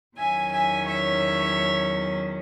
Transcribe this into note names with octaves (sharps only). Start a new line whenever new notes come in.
E2 D#3 F#3 C#4 E5 G#5
E5 G#5
C#5 E5